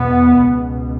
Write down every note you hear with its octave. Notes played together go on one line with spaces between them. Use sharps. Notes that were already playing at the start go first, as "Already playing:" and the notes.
Already playing: E2 B2 B3
C#2 B2